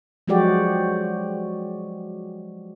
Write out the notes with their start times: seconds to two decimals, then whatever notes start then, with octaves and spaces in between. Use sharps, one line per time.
0.28 F3 F#3 G#3 F#4 G4 D5